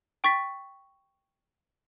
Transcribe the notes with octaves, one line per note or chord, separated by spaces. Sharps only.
G5 C#6 A6 B6